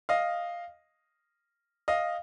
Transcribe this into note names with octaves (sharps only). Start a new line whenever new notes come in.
D#5 F5
D#5 F5